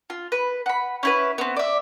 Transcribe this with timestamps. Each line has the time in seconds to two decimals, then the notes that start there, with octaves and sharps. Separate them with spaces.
0.10 F4
0.32 B4
0.66 F#5 B5
1.03 C#4 E4 B4
1.38 B3 C4
1.56 D5 E5